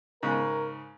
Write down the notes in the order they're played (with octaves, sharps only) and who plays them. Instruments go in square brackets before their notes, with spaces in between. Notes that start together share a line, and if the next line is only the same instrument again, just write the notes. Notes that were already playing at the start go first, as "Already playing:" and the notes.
[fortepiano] G#2 C#3 [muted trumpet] A#4